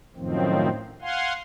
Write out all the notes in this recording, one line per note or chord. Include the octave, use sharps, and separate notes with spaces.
F#2 A2 D#3 F3 C4
F5 F#5 G#5 C6